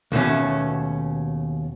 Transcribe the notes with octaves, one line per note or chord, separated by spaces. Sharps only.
D#2 B2 A3 C#4